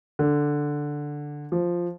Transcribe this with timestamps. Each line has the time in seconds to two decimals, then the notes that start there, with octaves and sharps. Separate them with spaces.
0.19 D3
1.52 F3